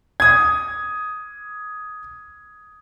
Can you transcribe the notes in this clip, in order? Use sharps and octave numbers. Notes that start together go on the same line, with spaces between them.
D#6 G#6